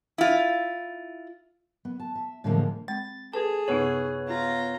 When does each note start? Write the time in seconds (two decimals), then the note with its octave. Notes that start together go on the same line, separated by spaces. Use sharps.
0.18 E4 F4
1.85 B3
2.00 A5
2.15 E5
2.44 A2 D3 E3 F3 G#3 A#3
2.88 G#3 C4 A6
3.34 G#4 A4 B4 A5
3.68 F#2 C3 B3 D#4 B4 C#5
4.27 F4 A#5